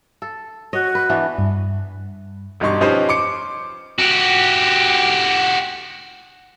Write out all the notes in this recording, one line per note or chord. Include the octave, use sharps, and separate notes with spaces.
A4
F#4 C#5 D#5
B4
E3 B3 D4
G2
E1 G2 G3 D#4 C6 C#6
F3 C#4 D#4 G4 B4 C5
C6 D6 C#7
F#4 G4